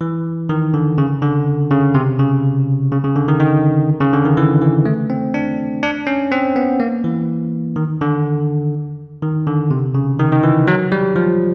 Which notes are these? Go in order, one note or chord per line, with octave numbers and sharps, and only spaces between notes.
E3
D#3
D3
C#3
D3
C#3
C3
C#3
C#3
C#3
D3
D#3
D#3
C#3
D3
D#3
E3
E3
A3
C4
D4
D4
C#4
C4
B3
A#3
E3
D#3
D3
D#3
D3
C3
C#3
D#3
D#3
E3
F#3
G3
F3